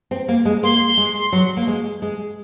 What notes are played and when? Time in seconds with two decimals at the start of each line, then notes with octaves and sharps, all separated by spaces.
0.11 C4
0.28 A#3
0.45 G#3
0.63 A#3 C6
0.97 G#3
1.32 F#3
1.57 A#3
1.67 G#3
2.02 G#3